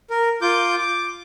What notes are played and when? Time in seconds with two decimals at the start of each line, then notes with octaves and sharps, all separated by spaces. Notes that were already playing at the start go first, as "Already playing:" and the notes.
0.10 A#4
0.42 F4 D6 G6
0.78 D6